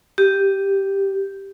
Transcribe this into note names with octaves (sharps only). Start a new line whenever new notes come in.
G4